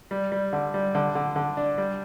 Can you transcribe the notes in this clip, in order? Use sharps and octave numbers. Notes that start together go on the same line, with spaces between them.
G3
G3
D3
G3
D3
D3
D3
D4
G3